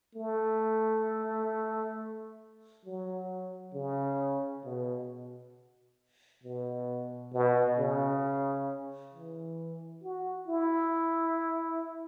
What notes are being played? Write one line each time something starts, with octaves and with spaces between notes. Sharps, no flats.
A3
F#3
C#3
B2
B2
B2
C#3
E3
F#4
E4